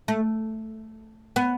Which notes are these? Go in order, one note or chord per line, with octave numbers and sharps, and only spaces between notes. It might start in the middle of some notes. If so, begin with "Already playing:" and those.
A3
B3